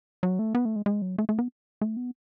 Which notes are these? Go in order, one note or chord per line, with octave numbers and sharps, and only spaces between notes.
F#3
A3
B3
A3
G#3
G#3
F#3
A3
A3
B3
A3
B3